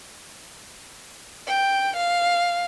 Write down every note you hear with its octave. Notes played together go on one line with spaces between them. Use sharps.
G5
F5